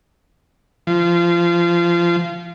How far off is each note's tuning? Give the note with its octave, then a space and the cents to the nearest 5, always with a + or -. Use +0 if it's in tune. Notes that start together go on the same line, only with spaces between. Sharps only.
F3 -25